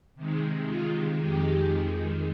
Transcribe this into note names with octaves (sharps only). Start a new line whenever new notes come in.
C3 D#3 G#3
F4
F2 D#3 G#3 G4